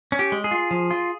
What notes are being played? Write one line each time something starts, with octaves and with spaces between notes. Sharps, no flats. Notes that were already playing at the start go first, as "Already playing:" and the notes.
C#4
G4
G#3
G#4
F4
F3
F4